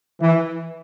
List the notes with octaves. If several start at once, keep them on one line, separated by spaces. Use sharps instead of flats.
E3